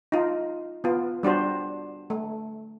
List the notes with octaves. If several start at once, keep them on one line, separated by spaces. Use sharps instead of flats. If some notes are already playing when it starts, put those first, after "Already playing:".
D#4 F4
B3 F4
G3 D4 F#4 C5
A3